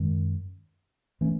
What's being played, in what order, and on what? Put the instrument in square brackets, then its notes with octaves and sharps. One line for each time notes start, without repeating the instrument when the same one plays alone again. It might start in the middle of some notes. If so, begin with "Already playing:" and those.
Already playing: [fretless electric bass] F#2 D#3 G#3
E3 A3 C#4